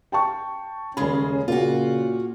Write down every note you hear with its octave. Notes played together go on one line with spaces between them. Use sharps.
G5 A5 C#6
D#1 C#3 G#3 C#4 B5
A#2 C#3 F4 F#4